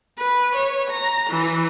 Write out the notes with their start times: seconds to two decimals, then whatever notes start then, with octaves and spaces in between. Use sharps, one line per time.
0.19 B4
0.56 C#5
0.90 A#5
1.30 E3